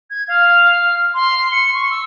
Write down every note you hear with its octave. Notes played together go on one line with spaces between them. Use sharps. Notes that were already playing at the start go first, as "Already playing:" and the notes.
G#6
F5
F6
C6
C#7
C#6
E6